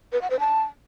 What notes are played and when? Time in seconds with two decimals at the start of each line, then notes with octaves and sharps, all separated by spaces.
0.12 B4
0.21 F#5
0.30 C5
0.39 A5